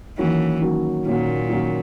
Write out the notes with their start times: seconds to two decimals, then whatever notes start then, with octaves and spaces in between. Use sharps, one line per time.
0.18 D#3 E3 F#3 A#3 C#4 F#4
0.62 D#3 F#3 A#3 C#4 F#4
1.06 A#2 D#3 F#3 A#3 C#4 F#4
1.49 D#3 F#3 A#3 C#4 F#4